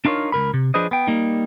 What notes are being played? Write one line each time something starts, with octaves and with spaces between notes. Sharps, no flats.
D4 D#4 F4 A#4 C#5
C#2 B2 A#4 B5
C3
F3 D4 G#4 B4 C5 D#5
B3 G5
G3 A#3 D#4